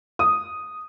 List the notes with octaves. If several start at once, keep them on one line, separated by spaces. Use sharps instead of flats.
D#6